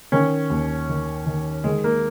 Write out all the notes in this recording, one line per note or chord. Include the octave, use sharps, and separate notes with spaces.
D#3 C#4
D#2
D#3
D#3
D#3 G#3
A#3